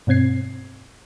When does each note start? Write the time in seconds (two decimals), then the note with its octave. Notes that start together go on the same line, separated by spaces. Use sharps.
0.07 G2 B2 C4 G#6 C7